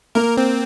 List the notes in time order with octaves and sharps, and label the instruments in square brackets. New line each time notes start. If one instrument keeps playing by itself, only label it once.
[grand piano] A#3 [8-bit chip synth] A#4
[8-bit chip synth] C4